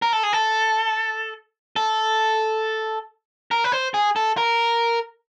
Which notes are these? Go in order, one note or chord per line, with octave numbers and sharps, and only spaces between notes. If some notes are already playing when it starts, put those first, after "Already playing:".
A#4
A4
G#4
A4
A4
A#4
B4
C5
G#4
A4
A#4